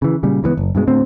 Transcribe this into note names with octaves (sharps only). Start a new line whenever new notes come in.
C#3 E3
A#2 C#3 G3
C#2 E3 A3 B3
F#1
G2 B2 G#3
D2 A2 C4